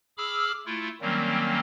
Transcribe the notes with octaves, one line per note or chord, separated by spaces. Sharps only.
G#4 B5 D6 E6 F6
A3 E4 F4
D#3 F#3 G3 A#3 C4 C#4